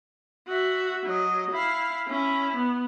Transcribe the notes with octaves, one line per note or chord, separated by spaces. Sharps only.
F#4 E5
F#3 D#5
E4 F5
C#4 E4
B3